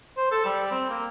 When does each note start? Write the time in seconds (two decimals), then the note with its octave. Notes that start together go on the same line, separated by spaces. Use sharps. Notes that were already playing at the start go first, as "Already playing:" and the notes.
0.17 C5
0.32 A4
0.45 G3
0.71 C4
0.89 A#3